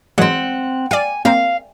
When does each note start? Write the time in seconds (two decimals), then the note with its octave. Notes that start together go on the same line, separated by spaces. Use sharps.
0.18 E3 F#3 G#3 C4 F#5
0.91 D5 F5 G#5
1.25 A#3 C4 F5 A#5